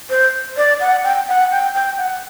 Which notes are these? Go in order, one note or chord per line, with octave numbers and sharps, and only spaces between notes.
C5
D5
F#5
G5
F#5
G5
G5
F#5